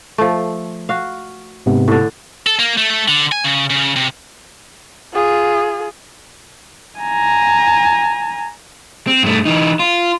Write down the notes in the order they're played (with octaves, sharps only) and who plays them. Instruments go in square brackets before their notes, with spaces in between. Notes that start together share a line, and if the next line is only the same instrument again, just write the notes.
[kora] F3 A3
F#4 F5
[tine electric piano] G#2 C3 B3
[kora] A2 D3
[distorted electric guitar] A4
A#3
A3
A3
D3
G#5
C#3
C#3
C3
[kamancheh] F4 G#4
[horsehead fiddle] G#5 A#5
[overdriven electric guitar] C4
G2 A3
E3 D#4
F4